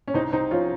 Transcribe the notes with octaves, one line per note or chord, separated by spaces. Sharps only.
C#4
C2 C4 D#4
C2 C4 D#4
F3 C#4 F4